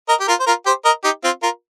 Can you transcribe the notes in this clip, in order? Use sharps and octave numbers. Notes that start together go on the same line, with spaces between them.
A#4 D#5
G4
F4 A#4
C5
F4 A#4
G4 C5
A#4 D#5
D#4 G4
C4 F4
F4 A#4